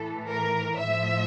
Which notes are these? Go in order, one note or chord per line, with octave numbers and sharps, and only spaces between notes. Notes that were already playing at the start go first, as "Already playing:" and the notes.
Already playing: A2 E3 A4
A#4
A2 F3 E5